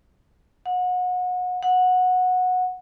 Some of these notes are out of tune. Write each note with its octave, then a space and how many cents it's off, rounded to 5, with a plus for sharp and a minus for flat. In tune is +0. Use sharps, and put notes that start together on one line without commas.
F#5 -30
F#5 -15